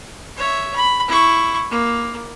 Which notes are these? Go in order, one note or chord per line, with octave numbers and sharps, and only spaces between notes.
C#5 E5
B5
E4 C#6
A#3